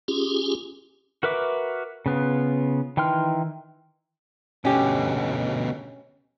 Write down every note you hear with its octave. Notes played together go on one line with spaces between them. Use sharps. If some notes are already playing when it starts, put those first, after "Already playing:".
C#4 F4 G4 G#4
F#4 A#4 B4 E5 D6
C#3 B3 F4
D#3 E3 G5 C6 F6
D2 B2 C#4 G4